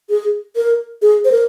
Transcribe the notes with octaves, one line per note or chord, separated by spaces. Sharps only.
G#4
A#4
G#4
C5
A#4